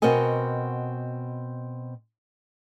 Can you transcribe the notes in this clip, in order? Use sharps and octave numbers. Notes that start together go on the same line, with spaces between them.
B2 C4 F#4 A#4 D#5 G#5